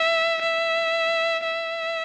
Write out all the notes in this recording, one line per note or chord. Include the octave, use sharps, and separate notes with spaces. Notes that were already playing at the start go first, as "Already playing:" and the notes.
Already playing: E5
E5
E5